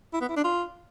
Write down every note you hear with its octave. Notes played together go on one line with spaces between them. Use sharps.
E4
B3
E4
D4
F4